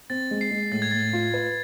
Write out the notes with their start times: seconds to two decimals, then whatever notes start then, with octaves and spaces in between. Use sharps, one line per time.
0.10 C4 A6
0.31 G#3
0.41 C7
0.51 G#3
0.72 A2 A6
0.82 G#6
0.91 A2 A6
1.13 F4
1.34 B4